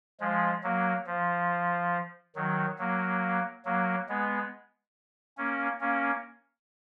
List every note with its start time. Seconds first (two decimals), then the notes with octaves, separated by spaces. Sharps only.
0.20 F3 G#3
0.63 F#3 A#3
1.07 F3
2.35 D#3 F#3
2.79 F#3 A#3
3.65 F#3 A#3
4.09 G#3 B3
5.38 A#3 C#4
5.81 A#3 C#4